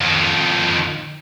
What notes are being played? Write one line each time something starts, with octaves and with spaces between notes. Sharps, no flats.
F2 D#3